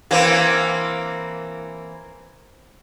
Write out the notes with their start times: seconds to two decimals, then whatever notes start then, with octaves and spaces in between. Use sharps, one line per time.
0.11 E3 A#3 C4